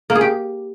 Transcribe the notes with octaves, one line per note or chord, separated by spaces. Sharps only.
A#3
G#4
G4